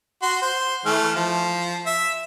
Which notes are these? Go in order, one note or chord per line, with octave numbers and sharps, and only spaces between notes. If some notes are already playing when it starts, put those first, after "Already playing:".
F#4 C6
C5
E3 A3 F6
F3
E5